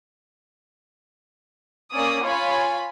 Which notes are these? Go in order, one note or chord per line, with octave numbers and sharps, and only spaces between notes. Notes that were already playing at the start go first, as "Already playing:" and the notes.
A#3 C#4 D5 D#6
F4 C#5 G#5 B5